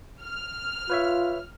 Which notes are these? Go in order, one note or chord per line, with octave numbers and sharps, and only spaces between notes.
F6
F4 B4 C#5 E5